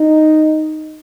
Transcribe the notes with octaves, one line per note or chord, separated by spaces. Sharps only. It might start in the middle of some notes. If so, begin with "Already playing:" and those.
Already playing: D#4